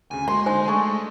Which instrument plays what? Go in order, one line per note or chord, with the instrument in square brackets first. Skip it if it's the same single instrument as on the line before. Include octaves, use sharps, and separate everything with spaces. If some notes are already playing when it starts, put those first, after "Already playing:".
[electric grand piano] D2 C#3 [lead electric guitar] G#5
[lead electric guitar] G#3 [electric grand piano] A#3 F#4 [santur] C6
[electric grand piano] D3 D#4 [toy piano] C5 G#5
[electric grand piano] A3 D4 G#4 [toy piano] G#5 C#6